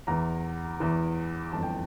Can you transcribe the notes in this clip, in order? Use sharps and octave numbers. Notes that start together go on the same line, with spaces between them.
E2 E3 A#5
E2 E3
G1 F2 E3 A5
G5